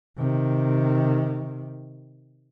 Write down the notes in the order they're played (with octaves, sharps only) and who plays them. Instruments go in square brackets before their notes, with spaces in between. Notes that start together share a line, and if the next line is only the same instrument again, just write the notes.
[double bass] C3 D#3